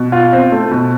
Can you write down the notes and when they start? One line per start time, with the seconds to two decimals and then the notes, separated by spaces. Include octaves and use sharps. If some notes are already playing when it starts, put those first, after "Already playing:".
Already playing: B2
0.12 F4
0.33 C4
0.52 A3
0.71 B2